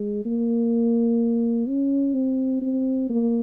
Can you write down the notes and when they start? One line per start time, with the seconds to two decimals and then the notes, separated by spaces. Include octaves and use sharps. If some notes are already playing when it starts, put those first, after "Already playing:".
Already playing: G#3
0.25 A#3
1.67 C#4
2.14 C4
2.62 C4
3.10 A#3